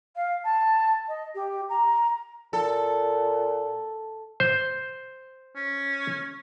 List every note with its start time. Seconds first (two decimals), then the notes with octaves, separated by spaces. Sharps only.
0.15 F5
0.44 A5
1.08 D#5
1.34 G4
1.69 A#5
2.53 A#2 A4
4.40 C5
5.56 C#4